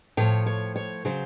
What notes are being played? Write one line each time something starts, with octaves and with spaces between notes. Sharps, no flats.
A2 F3 C#5
C#5
C#5
C#3 F#3 C5